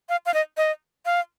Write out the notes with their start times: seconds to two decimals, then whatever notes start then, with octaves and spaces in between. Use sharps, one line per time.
0.09 F5
0.26 F5
0.34 D#5
0.57 D#5
1.06 F5